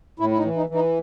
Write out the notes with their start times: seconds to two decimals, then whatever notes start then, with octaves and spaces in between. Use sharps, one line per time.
0.19 A2 E4
0.32 E4
0.38 D#4
0.44 E3
0.57 D#4
0.69 E3
0.75 D#4